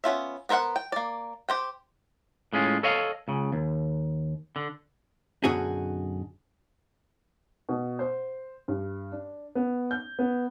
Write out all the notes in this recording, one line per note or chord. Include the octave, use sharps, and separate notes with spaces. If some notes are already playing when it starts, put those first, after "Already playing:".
B3 C#4 F4 E5
B3 A#4 C5 E5 F#5
G5
A#3 D5
G4 C5 G5
A2 G#3 C#4 F4
A4 C#5 D#5 F5
C#2 C#3
D#2
D3
B1 F#2 D3 D#4 F#4 G#4
B2
C5
G2
D4
B3
G6
B3